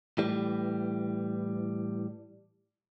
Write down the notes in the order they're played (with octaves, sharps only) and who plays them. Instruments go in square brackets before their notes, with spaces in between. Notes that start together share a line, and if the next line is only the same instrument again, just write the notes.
[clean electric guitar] A2 E3 G3